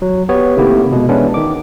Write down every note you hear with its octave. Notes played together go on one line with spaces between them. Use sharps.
F#3
B3 G4 C#5
C3 D#3 A3 A#3 E4 G4
B2 G#3
E3 G#3 B3 C#4 D4 E4
D#3 D6